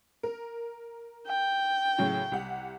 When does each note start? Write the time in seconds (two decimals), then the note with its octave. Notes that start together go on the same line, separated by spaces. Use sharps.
0.23 A#4
1.27 G5
1.98 A2 C#3 F#3
2.32 C2 G4 F#5